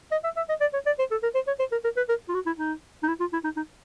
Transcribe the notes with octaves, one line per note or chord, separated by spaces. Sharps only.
D#5
E5
E5
D#5
D5
C#5
D5
C5
A4
A#4
C5
C#5
C5
A#4
A#4
B4
A#4
F4
F#4
E4
D#4
D#4
E4
F4
E4
D#4
D#4